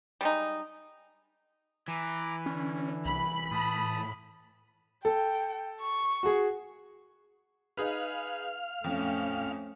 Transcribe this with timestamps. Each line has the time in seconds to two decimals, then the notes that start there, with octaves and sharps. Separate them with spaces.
0.21 G3 G#3 D#4
1.88 E3 A#5 D6
2.46 D3 C#4 D4
3.05 C2 B5
3.51 A2 A5 D#6
5.05 A4 G5
5.81 C#6
6.23 F#4 G#4
7.77 D#4 G#4 B4 F5
8.84 F2 A3 C#4